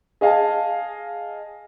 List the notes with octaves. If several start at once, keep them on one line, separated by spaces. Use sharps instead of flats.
G#4 D#5 F5 G#5 A5